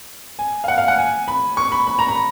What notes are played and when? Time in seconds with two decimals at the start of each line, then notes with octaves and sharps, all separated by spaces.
0.39 G#5
0.64 F5
0.68 F#5
0.78 F5
0.88 F#5
0.98 G#5
1.28 B5
1.57 C#6
1.72 B5
1.87 B5
1.99 A#5
2.08 B5